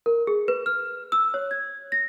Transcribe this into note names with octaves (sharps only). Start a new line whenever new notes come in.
A#4
G#4
B4
F6
E6
C#5
G#6
A#6